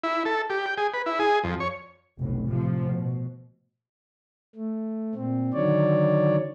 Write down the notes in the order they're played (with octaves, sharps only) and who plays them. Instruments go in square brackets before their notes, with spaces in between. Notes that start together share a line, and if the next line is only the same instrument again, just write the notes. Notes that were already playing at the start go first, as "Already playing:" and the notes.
[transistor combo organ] E4
A4
G4
G5
G#4
B4
E4
G#4
F2
C#5
[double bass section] F1 B1 A2
A2 C3 F3
B2
[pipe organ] A3
A#2 C4
D3 D#3 F#3 C#5 D5